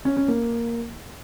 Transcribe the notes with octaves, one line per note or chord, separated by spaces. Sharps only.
C#4
C#4
A#3